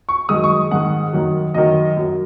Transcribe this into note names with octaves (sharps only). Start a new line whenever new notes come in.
C#6
F#2 D#3 G#3 D#6
C#6
G#2 D#3 G#3 F#5
F#2 D#3 F#3
F#2 D#3 F#3 D#5
F#2 F#3